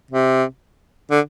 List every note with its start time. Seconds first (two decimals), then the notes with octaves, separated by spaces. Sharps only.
0.11 C3
1.11 D3